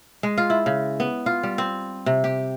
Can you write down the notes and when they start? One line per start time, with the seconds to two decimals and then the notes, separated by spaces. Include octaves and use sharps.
0.23 G#3
0.38 F4
0.50 E4
0.66 C#3
1.00 B3
1.26 F4
1.43 G3
1.58 C4
2.06 C3
2.24 G4